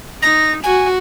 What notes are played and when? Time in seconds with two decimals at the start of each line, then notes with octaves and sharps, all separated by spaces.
0.22 D#4 A#6
0.64 F#4 G#5